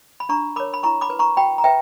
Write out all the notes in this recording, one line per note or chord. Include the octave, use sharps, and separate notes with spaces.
B5
D4 A#5 C#6
A#4 C#5 B5 D6
B5
E4 A#5 C#6
B5 D6
B4
A#5 C#6
F#4 G5 B5
A#5
B4 E5 G5